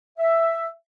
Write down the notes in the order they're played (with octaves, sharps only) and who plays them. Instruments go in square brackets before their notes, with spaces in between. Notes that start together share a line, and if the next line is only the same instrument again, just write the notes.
[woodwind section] E5